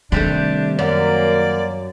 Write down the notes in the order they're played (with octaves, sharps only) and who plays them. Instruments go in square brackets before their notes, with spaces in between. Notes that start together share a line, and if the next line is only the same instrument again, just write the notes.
[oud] C3 G3 A3 [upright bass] D#3 [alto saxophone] D4
[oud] F#2 [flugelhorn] A#3 [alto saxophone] D5